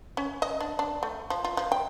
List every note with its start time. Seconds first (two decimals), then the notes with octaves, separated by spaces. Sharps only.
0.17 C#4
0.42 D#5
0.60 D4
0.79 D4
1.03 A3
1.30 F3
1.45 F4
1.57 F3
1.72 G5